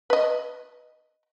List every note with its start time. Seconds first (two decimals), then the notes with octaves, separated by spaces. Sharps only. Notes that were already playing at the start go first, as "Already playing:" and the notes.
0.10 B4 D#5